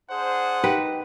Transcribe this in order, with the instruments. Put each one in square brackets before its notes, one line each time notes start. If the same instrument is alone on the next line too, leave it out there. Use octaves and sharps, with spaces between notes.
[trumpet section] D4 G#4 C5 [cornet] F#5
[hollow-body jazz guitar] D#4 G4 [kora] B4